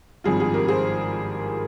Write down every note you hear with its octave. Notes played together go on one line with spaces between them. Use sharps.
G#1 G2 F3 C4 F4 G#4
F4 G#4
G4 A#4
G#4 C5